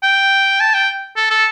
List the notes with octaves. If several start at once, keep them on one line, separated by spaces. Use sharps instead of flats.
G5
A5
G5
A4
A4